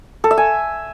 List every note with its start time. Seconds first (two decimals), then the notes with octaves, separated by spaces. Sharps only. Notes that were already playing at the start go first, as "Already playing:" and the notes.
0.24 A4
0.31 E5
0.37 G#5